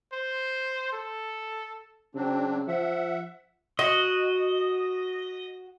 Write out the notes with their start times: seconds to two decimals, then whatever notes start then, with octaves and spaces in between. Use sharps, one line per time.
0.13 C5
0.92 A4
2.15 C#3 F#3 C4 D4
2.68 F3 E5 F#5
3.79 F#4 D#5